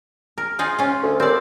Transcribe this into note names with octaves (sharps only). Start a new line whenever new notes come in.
A#4
D#4 F4 G#4
C#4 F4
D2
D#2 C4 D5